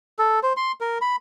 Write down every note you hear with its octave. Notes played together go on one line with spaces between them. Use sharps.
A4
C5
C6
A#4
B5